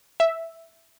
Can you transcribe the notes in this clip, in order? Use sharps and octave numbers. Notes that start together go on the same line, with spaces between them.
E5